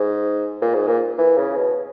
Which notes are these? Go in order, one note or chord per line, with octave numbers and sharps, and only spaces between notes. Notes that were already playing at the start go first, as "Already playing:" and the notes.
Already playing: G#2
A#2
G#2
A#2
E3
C#3
B2